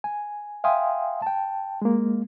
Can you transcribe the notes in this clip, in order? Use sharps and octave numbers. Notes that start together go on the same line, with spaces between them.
G#5
E5 F5 G5 G#5 C6 D#6
G5 A5
G#3 A#3